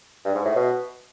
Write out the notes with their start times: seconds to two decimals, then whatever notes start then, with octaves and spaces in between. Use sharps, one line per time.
0.25 G2
0.35 G#2
0.45 A2
0.55 B2